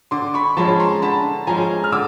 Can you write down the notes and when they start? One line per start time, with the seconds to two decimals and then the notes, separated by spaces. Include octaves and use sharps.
0.11 D3 C6 D6
0.34 B5 C#6
0.57 F3 G#3 C#4 A5 B5
0.80 A#5 C6
1.02 D3 A5 B5
1.47 F3 G#3 C#4 G#5 A#5
1.84 F6
1.92 D3 D6 E6